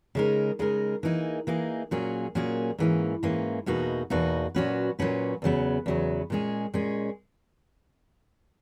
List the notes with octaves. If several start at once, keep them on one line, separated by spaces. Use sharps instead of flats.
C#3 G#3 D#4 A#4
C#3 G#3 D#4 A#4
E3 A#3 D#4 G#4
E3 A#3 D#4 G#4
A#2 F#3 A#3 C#4 G#4
A#2 F#3 A#3 C#4 G#4
G#2 E3 A#3 C#4
G#2 E3 A#3 C#4
E2 B2 A#3 D#4 F#4
E2 B2 A#3 D#4 F#4
A#2 F#3 C#4 F#4 B4
A#2 F#3 C#4 F#4 B4
E2 C#3 F#3 B3
E2 C#3 F#3 B3
A#2 G#3 C#4 G#4
A#2 G#3 C#4 G#4